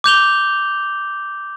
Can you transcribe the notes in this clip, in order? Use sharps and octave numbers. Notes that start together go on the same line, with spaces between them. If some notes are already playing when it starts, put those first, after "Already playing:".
D6 G6 F7 G7